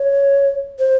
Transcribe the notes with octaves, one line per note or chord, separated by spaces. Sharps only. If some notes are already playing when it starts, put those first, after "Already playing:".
Already playing: C#5
C5